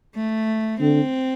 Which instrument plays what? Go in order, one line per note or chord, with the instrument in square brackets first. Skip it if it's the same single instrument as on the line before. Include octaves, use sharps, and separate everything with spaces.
[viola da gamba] A3
[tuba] D3 [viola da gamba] C4